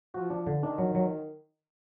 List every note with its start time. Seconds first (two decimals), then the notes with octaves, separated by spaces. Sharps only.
0.14 F3 F#4
0.30 D4
0.47 D3
0.62 D#3 D4
0.78 F#3
0.95 F#3